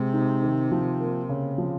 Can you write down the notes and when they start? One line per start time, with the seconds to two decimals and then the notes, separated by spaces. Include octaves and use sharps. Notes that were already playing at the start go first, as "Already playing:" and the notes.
Already playing: C3 G#3
0.13 D#4
0.43 D#3
0.72 F3
1.00 A#3
1.29 C#3
1.58 F3